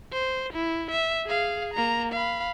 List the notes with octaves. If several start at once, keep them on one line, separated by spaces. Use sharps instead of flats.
C5
E4
E5
G#4 F5
A#3 A#5
F5 B5